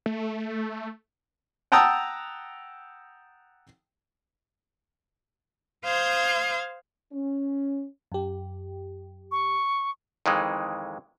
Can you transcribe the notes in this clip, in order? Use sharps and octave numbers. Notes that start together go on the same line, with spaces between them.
A3
F#5 G5 A5 A#5 D#6 E6
C5 F5 D#6 G6 G#6
C#4
F#2 G4
C#6
F2 D#3 E3 G#3